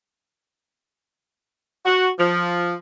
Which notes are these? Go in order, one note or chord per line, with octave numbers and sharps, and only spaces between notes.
F#4
F3